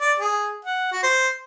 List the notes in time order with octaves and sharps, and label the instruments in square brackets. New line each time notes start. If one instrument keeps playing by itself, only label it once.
[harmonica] D5
G#4
F#5
F#4
C5